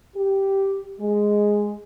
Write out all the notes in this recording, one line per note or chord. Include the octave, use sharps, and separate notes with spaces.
G4
G#3